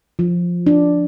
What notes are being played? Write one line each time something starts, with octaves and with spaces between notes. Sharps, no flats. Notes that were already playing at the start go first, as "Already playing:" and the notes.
F3
D4